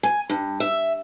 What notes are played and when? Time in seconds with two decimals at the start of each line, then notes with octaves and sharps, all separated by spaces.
0.03 G#5
0.30 G2
0.60 E5